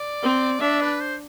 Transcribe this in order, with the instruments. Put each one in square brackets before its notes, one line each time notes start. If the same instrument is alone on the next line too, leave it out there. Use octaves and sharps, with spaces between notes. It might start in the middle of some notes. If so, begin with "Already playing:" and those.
Already playing: [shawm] D5
[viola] C4
[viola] D4 [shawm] E5
[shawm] B4
C5